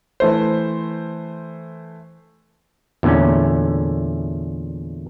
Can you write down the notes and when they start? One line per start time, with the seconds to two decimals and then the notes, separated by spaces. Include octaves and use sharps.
0.20 E3 A3 C5
3.03 E2 A#2 D3 A3 C#4